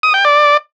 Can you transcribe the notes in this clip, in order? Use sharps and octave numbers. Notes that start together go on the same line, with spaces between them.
D#6
G5
D5